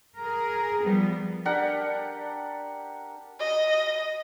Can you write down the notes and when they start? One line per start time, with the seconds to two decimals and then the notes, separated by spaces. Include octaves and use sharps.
0.20 G#4 A#4
0.84 F3 G3 B3
1.45 D4 G4 A#4 F#5
3.40 D#5